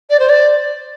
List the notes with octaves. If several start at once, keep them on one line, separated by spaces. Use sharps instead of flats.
D5
C5
D5